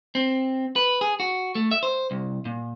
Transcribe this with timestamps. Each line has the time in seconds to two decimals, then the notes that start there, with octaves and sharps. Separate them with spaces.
0.15 C4
0.76 B4
1.01 G#4
1.20 F#4
1.55 A3
1.71 E5
1.83 C5
2.11 C2
2.45 A#2